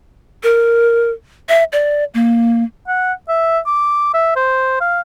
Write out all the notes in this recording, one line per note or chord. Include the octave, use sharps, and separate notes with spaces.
A#4
E5
D5
A#3
F#5
E5
D6
E5
C5
F5